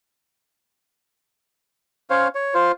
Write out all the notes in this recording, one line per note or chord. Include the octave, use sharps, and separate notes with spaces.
C#4 C5 C#5 F5
C#5
F4 C5